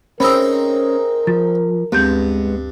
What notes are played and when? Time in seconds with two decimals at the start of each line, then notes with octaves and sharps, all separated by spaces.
0.20 C4 C#4 D#4 G#4 A#4 B5 E6
1.27 F3 A6
1.92 D2 G2 G#3 B3 C4 G6